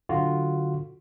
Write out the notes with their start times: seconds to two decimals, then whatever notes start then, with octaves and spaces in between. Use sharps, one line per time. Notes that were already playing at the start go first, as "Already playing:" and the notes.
0.09 D3 F#3 F4 F#4